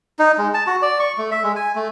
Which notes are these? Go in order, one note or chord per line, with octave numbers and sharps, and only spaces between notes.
D#4
G#3
A5
F#4
D5
C#6
A3
E5
G#3
G#5
A3